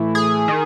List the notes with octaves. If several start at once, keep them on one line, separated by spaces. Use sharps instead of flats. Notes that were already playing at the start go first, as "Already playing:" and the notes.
Already playing: A2 E3
G#4
D#3